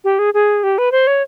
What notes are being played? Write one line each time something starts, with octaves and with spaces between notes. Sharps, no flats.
G4
G#4
G#4
G4
B4
C5
C#5